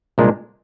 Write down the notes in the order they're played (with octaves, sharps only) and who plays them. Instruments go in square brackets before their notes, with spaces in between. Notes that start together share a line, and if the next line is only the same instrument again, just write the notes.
[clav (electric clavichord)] C2 A#2 G#3 D4